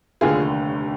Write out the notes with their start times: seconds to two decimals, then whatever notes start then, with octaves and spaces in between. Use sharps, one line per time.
0.21 F1 D#2 D3 F4 G#4